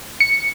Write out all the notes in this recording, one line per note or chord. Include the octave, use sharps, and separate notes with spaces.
C#7